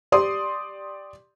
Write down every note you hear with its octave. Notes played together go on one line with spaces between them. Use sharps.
G4 D5 C6 D#6